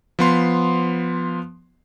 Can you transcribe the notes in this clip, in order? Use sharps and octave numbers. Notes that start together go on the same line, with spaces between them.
F3 B3 C6